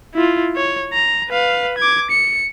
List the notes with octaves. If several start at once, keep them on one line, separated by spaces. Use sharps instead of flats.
E4 F4
C#5
A#5
B4 F5
D6 G#6
C#7